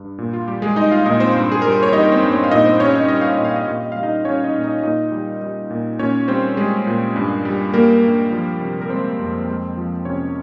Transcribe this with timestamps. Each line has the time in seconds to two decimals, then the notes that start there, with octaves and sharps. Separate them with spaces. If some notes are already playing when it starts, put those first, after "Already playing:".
Already playing: G2
0.18 A#2
0.33 F4
0.48 G3 G4
0.62 G#3 G#4
0.76 G3 D#4 D#5
0.91 F4 F5
1.06 A#2 D#4 D#5
1.20 C4 C5
1.35 G2
1.52 G#4
1.62 G3 A#4
1.72 C5
1.83 C#5
1.92 G3 D#4 D#5
2.02 A#4
2.12 C4 C5
2.22 G2
2.32 C4 C5
2.44 F5
2.51 A#2 D#4 D#5
2.65 C4 C5
2.80 G3 C#4 C#5
2.94 D#4 D#5
3.08 G3 D#5
3.21 F5
3.33 D#5
3.38 A#2
3.45 F5
3.56 D#5
3.67 A#2 F5
3.80 D#5
3.92 G3 F5
4.03 D#4 D#5
4.25 G3 C#4 C#5
4.44 D#4 D#5
4.55 A#2
4.64 D#4 D#5
4.83 A#2 D#4 D#5
5.12 G3
5.42 G3
5.70 A#2
5.99 A#2 C#4 C#5
6.28 G3 C4 C5
6.57 G3 G#3 G#4
6.87 A#2
7.16 G2
7.45 G3
7.73 G3 A#3 A#4
8.03 G2
8.32 F3
8.61 C3
8.81 A#4
8.90 G#3 C4 C5
9.19 F2
9.48 G#3
9.77 F3
10.05 C3 C#4 C#5